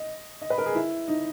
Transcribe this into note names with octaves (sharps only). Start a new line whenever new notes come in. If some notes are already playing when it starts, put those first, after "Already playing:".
Already playing: D#5
D#5
B4
A#4
G#4
E4
D#4